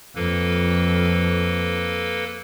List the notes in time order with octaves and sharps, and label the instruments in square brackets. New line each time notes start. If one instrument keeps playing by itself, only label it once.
[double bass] F2 [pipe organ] A#3 A4 B4